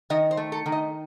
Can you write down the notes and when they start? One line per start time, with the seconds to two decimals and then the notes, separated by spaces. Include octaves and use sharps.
0.10 D#3 D#5
0.31 C5
0.37 A3
0.52 A4
0.66 D#3
0.72 D#5